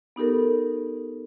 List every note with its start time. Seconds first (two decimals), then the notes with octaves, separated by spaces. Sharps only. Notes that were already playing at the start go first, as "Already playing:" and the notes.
0.16 B3 D#4 G4 A4 A#4